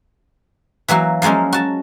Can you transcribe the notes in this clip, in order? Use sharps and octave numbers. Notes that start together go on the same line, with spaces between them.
E3 F#3 A#3 F#4
F3 F#3 G#3 A#3 C#4
F#4 A5